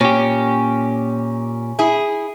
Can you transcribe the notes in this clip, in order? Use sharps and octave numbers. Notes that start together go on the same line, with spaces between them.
A#2 C#4 G4
E4 G#4